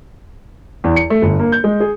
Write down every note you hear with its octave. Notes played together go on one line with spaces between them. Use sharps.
E2
C#7
A3
G1
A#3
G6
G#3
G#4